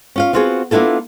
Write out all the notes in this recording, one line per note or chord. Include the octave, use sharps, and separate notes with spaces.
C#4 F4 F5
B3 C4 F4 F#4 G#4
A#3 B3 D4 E4 F4 A4